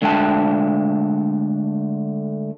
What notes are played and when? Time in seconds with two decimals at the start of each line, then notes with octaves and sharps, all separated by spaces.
0.02 D3 G#3 A3 D4 G5 A5